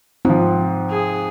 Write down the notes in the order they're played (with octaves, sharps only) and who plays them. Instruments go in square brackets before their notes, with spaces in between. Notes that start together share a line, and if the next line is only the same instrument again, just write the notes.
[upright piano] G#2 F3 [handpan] C4
[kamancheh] G#4